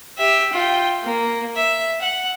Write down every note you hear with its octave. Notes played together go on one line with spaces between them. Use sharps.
G4 E5
F4 G5
A#3
E5
F#5